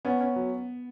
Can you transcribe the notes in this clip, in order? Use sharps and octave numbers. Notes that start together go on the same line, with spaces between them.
B3 C#4
C#4
F#3